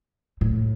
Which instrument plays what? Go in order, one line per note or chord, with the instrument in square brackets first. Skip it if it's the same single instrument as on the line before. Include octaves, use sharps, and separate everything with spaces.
[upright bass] A2